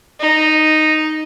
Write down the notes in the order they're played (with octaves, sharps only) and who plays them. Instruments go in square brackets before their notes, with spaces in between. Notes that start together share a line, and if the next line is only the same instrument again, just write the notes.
[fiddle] D#4